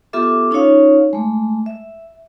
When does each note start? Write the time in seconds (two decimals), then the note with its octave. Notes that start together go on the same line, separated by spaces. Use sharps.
0.13 B3 F4 G4 A4 E5 D6
0.51 C#4 D#4 F4 C#5 F5
1.13 G#3 A3
1.66 E5